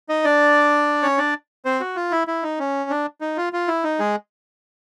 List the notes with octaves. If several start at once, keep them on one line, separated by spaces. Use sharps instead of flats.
D#4 D#5
D4 D5
C#4 C#5
D4 D5
C4 C5
F#4
F4
E4
E4
D#4
C#4
D4
D#4
F4
F4
E4
D#4
G#3 G#4